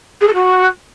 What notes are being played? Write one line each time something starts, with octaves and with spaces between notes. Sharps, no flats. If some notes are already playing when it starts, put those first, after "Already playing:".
G#4
A4
F#4